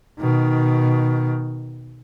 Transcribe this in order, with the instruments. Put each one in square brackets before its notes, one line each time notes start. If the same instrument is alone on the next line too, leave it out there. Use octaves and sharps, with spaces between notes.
[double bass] B2 D#3